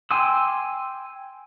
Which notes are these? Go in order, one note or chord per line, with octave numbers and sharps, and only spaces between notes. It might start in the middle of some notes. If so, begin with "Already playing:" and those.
G5 G#5 C6 D6 E6